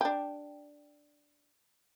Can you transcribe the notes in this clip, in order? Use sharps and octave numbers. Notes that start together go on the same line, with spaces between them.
D4 G4